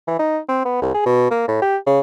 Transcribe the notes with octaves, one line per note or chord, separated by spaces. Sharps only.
E3
D#4
C4
B3
C2
G#4
B2
A#3
A2
G4
C#3